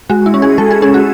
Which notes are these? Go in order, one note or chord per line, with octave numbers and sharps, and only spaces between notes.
G#3 F#4
E4
C#4
G#4
G#3 A4
G#4
C#4 G#4
F#4